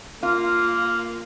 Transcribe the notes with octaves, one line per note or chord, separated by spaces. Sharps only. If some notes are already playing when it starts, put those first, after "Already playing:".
A#3 F4